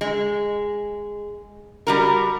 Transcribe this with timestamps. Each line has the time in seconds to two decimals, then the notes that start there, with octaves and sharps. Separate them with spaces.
0.01 G#3
1.87 G3 F#4 A#4